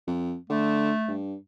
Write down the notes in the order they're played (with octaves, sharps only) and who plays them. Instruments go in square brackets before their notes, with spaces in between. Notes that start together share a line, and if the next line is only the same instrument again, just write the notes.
[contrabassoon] F2
[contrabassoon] D3 [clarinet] A3
[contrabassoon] G2